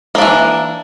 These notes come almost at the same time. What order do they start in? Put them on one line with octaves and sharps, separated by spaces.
A#3 D4 E3